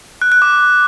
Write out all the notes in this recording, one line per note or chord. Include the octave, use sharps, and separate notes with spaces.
F#6
F#6
D6